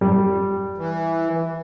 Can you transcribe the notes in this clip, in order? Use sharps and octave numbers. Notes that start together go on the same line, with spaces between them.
G3
E3